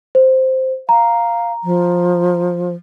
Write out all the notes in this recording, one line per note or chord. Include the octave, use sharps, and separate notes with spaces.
C5
F5 A#5
F3